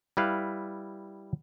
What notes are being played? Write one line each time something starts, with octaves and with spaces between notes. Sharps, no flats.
G3 E4 B4 F5